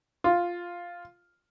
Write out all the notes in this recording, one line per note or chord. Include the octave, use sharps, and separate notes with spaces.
F4